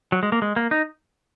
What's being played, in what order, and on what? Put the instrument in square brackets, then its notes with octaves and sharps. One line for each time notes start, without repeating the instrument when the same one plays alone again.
[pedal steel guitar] F#3
G#3
A#3
G#3
A#3
D#4